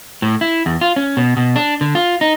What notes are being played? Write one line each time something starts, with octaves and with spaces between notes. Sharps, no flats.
A2
E4
E2
F4
C#4
B2
B2
D4
D3
F4
D#4